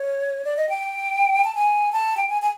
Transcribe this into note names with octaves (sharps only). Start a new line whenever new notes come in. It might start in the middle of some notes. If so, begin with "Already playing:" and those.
Already playing: C#5
D5
D#5
G5
A5
G#5
A5
G5
G#5
G#5